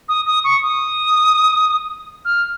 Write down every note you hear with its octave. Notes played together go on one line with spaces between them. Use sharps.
D#6
D#6
C#6
D#6
F6